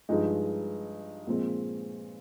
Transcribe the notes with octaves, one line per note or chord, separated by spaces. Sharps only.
G2 F3 G#3 D#4
A#2 F3 G#3 C4